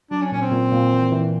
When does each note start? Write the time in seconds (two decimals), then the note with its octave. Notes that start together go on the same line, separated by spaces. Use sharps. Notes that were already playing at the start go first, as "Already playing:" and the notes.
0.11 F#3 D4
0.22 C#4
0.32 A#2 C#4
0.42 C4
0.52 A#2
0.72 A#2
0.93 E3
1.12 E3